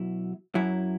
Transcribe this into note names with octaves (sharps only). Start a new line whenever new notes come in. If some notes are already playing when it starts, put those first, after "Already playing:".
Already playing: B2 F#3 E4
F#2 F#3 E4